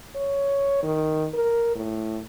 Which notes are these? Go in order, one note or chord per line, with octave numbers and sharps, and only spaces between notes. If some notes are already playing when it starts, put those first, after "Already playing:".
C#5
D#3
A#4
A2